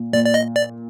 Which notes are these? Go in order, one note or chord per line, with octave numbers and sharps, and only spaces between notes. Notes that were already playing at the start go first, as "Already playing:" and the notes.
Already playing: A#2
A#2 D5
D5
D#5
D5